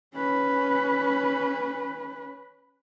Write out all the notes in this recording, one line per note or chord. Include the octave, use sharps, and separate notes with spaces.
C#4 B4